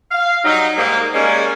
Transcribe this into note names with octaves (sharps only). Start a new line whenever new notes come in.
F5
F#3 G3 D#4
G#2 G3 A#3
G3 G#3 A#3 C#4